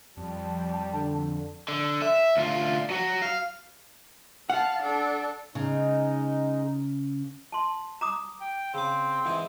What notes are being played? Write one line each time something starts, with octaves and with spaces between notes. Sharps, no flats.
F2 G3 A5
D3
D3
E5
D2 F4
F#3 F#4
F5
F5 F#5 A5
D4 A4
C#3 G#3 D#4
A5 C6
A#5 D6 D#6
G5
C#3 C4 D6
G#2 E3 G#4